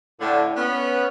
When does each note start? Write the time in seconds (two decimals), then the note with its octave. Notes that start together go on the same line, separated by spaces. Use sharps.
0.20 A2 D3
0.57 B3 C#4